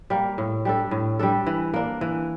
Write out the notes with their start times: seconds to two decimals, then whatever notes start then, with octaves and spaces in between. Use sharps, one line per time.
0.10 G3 A#3
0.38 A2
0.65 G3 D4 A4
0.91 A2
1.19 G3 D4 A4
1.47 E3
1.74 A#3 D4
2.01 E3